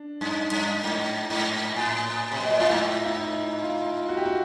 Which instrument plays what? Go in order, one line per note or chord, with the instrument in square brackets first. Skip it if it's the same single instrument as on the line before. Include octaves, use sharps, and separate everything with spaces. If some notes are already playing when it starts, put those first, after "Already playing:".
Already playing: [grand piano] D4
[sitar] G2
G2
G#2
G#2
A2
C3
B2
A#2
[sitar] A2 [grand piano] F4
[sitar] G#2 [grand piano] E4
[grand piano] E4
D#4
F4
F#4
G4
F#4